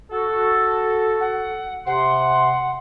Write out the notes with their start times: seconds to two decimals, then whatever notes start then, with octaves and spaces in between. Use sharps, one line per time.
0.11 F#4 A4
1.20 F#5
1.87 C3 F#5 C6